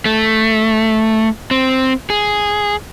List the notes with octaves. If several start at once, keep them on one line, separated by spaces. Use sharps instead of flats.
A3
C4
G#4